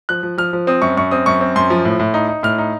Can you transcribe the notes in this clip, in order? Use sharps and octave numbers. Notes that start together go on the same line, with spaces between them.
F3 F#6
F3
F3 F6
F3
C4 D#6
F#2 C#6
F#2 C#6
C4 D#6
F#2 C#6
C4
F#2 C6
F3
A2
A2
D#4
D#4
A2 F6
D#4